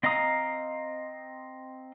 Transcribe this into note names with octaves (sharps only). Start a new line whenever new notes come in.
C4 D#5 F5 A#5 D#6